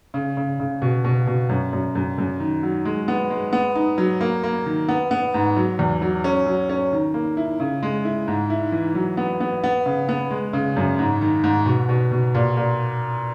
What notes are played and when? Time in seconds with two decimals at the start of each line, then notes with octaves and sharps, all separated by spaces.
0.14 C#3
0.37 C#3
0.60 C#3
0.82 B2
1.05 B2
1.27 B2
1.49 F#2
1.73 F#2
1.95 F#2
2.18 F#2
2.40 D#3
2.63 F#3
2.85 G#3
3.08 B3
3.30 G#3
3.53 B3
3.75 D#4
3.98 F#3
4.21 A#3
4.44 A#3
4.66 D#3
4.88 B3
5.11 B3
5.34 G#2
5.56 F#3
5.79 E2
6.02 F#3
6.24 C#4
6.46 F#3
6.69 C#4
6.93 D#3
7.14 A#3
7.37 E4
7.60 C#3
7.83 G#3
8.05 E4
8.28 G#2
8.50 E4
8.72 E3
8.95 F#3
9.17 B3
9.40 B3
9.64 B3
9.86 C#3
10.09 B3
10.31 G#3
10.53 C#3
10.76 F#2
10.99 G#2
11.21 D#3
11.44 G#2
11.66 B2
11.89 B2
12.12 B2
12.35 A#2
12.57 A#2